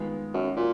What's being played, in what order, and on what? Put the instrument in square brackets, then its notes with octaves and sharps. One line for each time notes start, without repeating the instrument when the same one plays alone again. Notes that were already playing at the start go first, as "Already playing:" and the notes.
Already playing: [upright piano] D#3 G#3 B3 F4
[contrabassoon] F#2
A#2